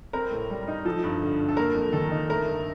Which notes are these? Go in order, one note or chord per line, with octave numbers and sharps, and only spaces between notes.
C4 A#4
A2
G3
D#4
F3 A4
G2
D3
G2
A4
A#3 A#4
F2
D#3 A4
D#4
A3 A#4
G2